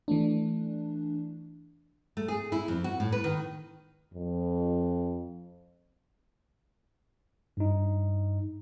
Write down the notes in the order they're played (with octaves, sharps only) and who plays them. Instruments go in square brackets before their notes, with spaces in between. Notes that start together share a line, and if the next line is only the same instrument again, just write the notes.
[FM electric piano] E3 A3 D4
[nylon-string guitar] A3
G#4
E4
F2
F#4
A2
B4
D#3
[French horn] F2
[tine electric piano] G2 D#4